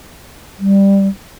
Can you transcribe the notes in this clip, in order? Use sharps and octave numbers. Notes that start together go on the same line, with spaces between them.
G3